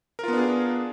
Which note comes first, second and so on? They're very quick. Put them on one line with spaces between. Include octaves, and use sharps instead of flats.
A#4 F4 B3 D4 G#4